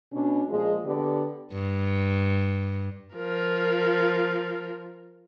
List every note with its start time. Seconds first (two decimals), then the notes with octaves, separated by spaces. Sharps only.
0.12 B2 C#4 D4
0.49 A#2 F3 G#3
0.85 D3 B3 G4 D5
1.53 G2
3.15 F3 A#4